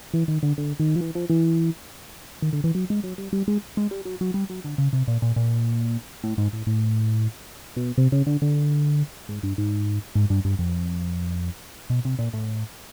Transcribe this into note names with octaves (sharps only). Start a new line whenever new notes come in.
E3
D#3
D3
D3
D#3
F3
E3
F3
E3
D#3
D3
E3
F#3
G#3
F#3
G3
G3
G#3
G#3
G3
F#3
F#3
G3
F#3
D3
C#3
C3
A#2
A#2
A#2
A2
G#2
A2
A2
B2
C3
C#3
D3
D3
G#2
G2
G#2
G#2
G2
G2
F2
B2
C3
A#2
A2